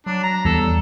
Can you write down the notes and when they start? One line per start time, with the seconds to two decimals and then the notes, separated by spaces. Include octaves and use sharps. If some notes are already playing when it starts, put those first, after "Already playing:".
0.06 F#3 D4
0.23 A#5
0.45 E2 G3 A4